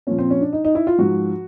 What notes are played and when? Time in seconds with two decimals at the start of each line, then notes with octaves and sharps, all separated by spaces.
0.07 A#2 F3 C#4
0.19 C4
0.30 C#4
0.41 D4
0.53 D#4
0.65 D#4
0.75 E4
0.87 F4
0.98 G#2 F3 F#4